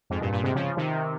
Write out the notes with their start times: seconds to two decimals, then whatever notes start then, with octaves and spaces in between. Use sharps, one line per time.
0.10 F2 G#2
0.21 G2 A#2
0.32 G2 A#2
0.43 G#2 C3
0.55 C#3 F3
0.77 C3 D#3